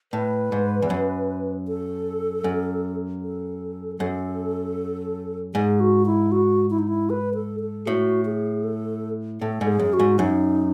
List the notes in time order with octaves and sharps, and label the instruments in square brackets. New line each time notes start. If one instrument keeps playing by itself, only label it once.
[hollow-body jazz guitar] A2 [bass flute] B4
[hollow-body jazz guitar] G#2
E2
F#2
[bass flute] A4
[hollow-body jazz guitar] F#2
[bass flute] A4
[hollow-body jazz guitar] F#2 [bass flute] A4
[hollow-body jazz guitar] G#2 [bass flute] G#4
[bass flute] F#4
E4
F#4
E4
D#4
E4
B4
A4
A4
[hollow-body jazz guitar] A2 [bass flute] F#4
[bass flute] G#4
A4
[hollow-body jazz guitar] A2 [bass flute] A4
[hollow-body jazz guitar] G#2
[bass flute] G#4
[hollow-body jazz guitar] F#2
[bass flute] F#4
[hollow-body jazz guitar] G#2
[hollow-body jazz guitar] F#2 [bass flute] D#4